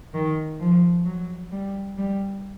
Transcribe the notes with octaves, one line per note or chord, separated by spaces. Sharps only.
D#3
F3
F#3
G3
G3